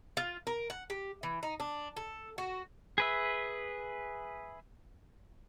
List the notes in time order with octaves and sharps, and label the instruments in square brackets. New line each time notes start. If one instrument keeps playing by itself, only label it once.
[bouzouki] F4
A#4
F#5
G4
E3
D#4
D4
A4
F#4
[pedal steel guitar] G#4 B4 E5